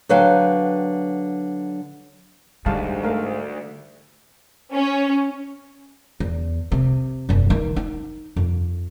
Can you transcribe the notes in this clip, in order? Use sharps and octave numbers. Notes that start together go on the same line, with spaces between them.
D3 F#3 B4 F5 G5
D2 G#2 D3 G3 F5 A5
A3 A#4 F5
C#4
E2
C3
F#1 E2
D#3 E3
D#4
F2